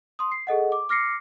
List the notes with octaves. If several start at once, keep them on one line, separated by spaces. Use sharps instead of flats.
C6 D#6
C7
G#4 A4 D#5 F#5
D6
D6 F6 A#6 C7 C#7